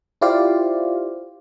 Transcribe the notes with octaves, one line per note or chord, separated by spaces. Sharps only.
E4 F4 G4 C5 D5 F5